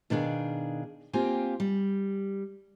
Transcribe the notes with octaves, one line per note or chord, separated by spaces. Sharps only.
B2 D#3 D4 G#4 F5
A#3 C4 F4 G4 G#5
G3